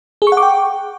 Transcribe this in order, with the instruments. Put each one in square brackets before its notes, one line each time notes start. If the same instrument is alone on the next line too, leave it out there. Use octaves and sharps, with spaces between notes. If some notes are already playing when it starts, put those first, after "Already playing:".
[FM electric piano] G#4
C#6
F#5
D6
G5